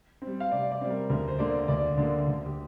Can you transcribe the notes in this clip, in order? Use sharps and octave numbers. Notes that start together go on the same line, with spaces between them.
C4
G3
F5
C3 D5
D5
G3 C4
A#4
D2 A#4
C5
D3 A#3 D5
D2 D5
D3 A#3 D5
D2
G4